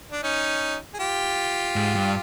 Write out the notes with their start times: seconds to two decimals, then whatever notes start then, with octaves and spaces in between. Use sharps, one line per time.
0.12 D4
0.23 C#4 D#4
0.94 G#4
0.99 F4 G4
1.76 G#2
1.95 G2